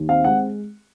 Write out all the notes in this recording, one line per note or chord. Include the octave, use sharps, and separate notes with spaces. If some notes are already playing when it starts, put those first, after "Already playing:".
Already playing: D#2
C4 F5
G#3 F#5